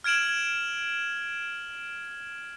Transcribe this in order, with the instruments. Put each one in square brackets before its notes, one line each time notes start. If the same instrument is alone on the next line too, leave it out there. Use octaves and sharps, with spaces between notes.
[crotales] F6 G#6 D7 E7 F#7